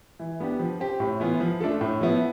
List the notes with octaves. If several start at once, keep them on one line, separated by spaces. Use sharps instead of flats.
E3
B3 D4 G4
F3
C4 G4
A2
E3 B3 F4
F3
A3 D4 F4 A4
A2
F3 B3 E4